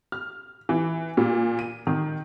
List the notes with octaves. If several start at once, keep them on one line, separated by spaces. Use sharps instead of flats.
F6
E3
A#2
D#7
D#3